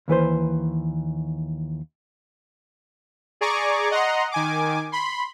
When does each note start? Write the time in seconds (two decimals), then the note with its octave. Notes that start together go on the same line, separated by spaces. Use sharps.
0.08 D#2 E3 B4 C5
3.41 G#4 D5 G#5 A#5 C#6 D6
3.91 D#5 F#5 A#5 C6
4.32 D#3 G#5 D6
4.92 B5 C6